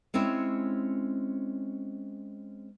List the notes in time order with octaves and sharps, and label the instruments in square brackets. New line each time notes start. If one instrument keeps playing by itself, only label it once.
[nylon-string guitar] G#3 C4 C#4 E4 C#5